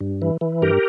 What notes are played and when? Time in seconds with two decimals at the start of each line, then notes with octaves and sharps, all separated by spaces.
0.01 G2
0.22 E3
0.41 E3
0.62 G2 G4 A#4